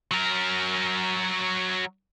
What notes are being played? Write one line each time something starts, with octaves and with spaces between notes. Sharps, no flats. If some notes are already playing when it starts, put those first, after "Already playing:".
F#3 A#4